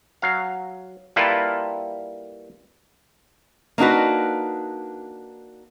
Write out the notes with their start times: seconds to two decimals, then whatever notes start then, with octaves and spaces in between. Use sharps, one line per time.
0.22 F#3 F5
1.16 G3 A#3 E4 F4 A4 B4
3.78 A#3 D4 D#4 F#4 B4